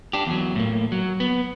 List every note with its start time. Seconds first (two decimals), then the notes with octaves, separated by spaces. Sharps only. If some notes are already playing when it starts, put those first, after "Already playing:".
0.13 D4 G4
0.27 E2 F#3
0.56 A2 A#3
0.92 F#3
1.20 B3